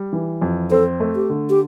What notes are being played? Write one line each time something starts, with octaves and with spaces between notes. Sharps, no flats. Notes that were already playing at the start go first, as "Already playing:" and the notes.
Already playing: G3
E3
F2
C4 A4
A3
G4
D3
G4